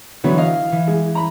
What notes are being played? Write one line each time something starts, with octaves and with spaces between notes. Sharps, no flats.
D3 E3 F#3 B3
D#5 F5
E3
G#3
A#5 B5